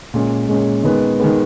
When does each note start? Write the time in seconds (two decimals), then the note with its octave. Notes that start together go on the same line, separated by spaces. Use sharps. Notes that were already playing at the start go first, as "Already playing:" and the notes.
0.14 A#2 G#3 C#4
0.49 A#2 G#3 C#4
0.83 D#3 G#3 B3
1.20 D#3 G#3 B3